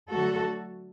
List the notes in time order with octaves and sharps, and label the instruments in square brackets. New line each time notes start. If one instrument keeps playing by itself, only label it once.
[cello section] D3 F#3 A3 F#4 A4